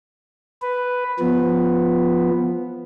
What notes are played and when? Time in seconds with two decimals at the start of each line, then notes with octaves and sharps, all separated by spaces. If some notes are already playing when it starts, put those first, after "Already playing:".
0.62 B4
1.19 F3 B3